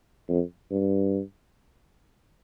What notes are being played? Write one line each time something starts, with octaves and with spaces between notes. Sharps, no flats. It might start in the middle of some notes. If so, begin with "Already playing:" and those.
F2
G2